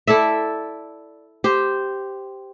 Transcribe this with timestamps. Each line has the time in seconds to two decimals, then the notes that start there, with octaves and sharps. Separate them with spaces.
0.07 E4 A4 D5 E5
1.44 G4 C5